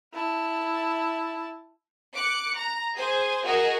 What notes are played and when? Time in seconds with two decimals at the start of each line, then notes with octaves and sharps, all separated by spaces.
0.13 E4 A5
2.14 D6 F#6 C#7
2.56 A#5
2.95 G#4 C5 G#5
3.43 F#4 G#4 A#4 D#5